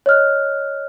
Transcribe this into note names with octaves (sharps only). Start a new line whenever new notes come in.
C#5 D#5 F6 F#6